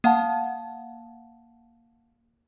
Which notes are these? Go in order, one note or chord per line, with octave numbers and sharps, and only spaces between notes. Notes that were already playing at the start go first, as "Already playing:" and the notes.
A#3 F5 F#5 A5